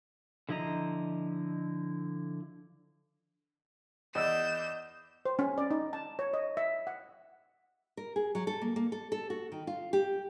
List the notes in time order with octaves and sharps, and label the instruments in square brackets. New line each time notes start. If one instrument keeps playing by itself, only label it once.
[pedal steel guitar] D3 F3 E4 D#5 A#5
[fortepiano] E2 D5 E6 [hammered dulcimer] D#5 [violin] G6 E7
[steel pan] C5
C#4
D5
D#4
A5
C#5
D#5
E5
F#5
[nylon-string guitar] A#4
G#4
F#3
A4
A#3
A#3
A4
A4
F#4
D#3
F4
G4